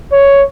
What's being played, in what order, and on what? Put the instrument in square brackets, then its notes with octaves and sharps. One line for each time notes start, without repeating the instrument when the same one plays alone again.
[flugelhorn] C#5